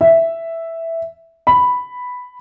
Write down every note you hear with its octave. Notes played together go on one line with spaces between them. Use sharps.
E5
B5